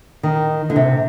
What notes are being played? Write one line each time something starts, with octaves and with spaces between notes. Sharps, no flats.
D#3
D3
C3